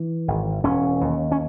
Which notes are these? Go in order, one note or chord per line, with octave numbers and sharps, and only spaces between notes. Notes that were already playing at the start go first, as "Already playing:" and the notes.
Already playing: E3
G#1
E1 C#4
D#2
C#4